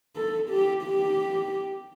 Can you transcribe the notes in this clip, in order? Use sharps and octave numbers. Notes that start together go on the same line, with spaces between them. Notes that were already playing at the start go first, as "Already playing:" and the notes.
A4
G4
G4